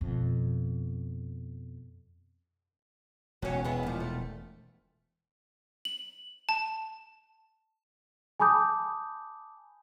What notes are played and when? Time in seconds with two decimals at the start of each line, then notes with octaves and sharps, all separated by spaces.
0.01 F2 B2
3.42 E1 F#3 C#4
3.65 G#3 B3 E4
3.83 A#2 F3
4.00 A3
5.85 F#7
6.49 A5
8.40 G#5 A5 B5 D6 D#6 G6